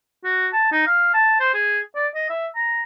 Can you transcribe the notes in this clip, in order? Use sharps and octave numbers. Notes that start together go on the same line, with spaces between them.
F#4
A5
D#4
F5
A5
C5
G#4
D5
D#5
E5
A#5